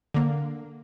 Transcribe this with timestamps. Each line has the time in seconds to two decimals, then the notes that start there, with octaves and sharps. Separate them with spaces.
0.14 D3 A#3